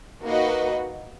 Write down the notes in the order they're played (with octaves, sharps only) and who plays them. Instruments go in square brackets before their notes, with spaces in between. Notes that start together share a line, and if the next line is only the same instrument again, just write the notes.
[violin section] A#3 D#4 F#4 B4 D#5